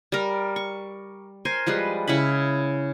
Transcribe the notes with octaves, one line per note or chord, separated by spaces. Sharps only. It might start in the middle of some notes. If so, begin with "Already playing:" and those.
G3 A#4
C#6
A#4 C5 G#5
F3 G3 G#3 B4
C#3 C#4 E4 B5